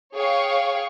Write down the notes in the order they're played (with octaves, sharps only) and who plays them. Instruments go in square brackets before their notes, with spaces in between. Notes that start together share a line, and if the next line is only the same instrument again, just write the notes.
[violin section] G#4 C#5 F5 G5 C#6